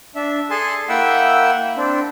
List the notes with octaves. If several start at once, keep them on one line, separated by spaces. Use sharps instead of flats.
D4 E5
G#4 A4 G#5 A5 C6
A#3 E4 E5 F#5 G5 E6
C4 D4